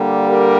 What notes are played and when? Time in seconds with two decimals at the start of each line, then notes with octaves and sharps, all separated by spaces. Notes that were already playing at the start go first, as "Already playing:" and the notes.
Already playing: D3 G3 A#3
0.27 G4 A#4